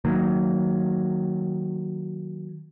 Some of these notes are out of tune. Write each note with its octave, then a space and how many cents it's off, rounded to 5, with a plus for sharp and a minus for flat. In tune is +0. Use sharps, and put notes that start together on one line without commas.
D#3 +0 F#3 +0 A#3 -20